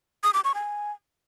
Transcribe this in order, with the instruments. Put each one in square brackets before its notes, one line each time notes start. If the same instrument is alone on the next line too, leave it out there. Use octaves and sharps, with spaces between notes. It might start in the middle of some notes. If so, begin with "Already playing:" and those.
[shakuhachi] D#6
D6
C#6
G#5